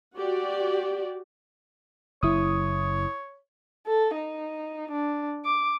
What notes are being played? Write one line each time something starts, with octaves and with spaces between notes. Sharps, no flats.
F#4 G4 D5
F#1 E4 C#5 D#6
A4
D#4
D4
D6